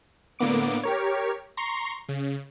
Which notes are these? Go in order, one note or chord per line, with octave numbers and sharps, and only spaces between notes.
A2 D3 A#3 B3 D6 D7
G4 A#4 C#5
A#5 C6 C#6 C7
C#3